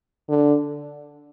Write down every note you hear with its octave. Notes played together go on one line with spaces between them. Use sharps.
D3